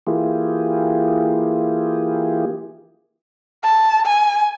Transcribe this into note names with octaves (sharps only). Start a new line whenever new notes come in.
E3 A#3 E4 F4 G4 G#4
A5
G#5